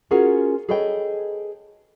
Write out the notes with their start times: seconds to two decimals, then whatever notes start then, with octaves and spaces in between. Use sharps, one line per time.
0.11 C#4 F4 F#4 G#4 A#4
0.69 G#4 A4 B4 C#5 D#5 G5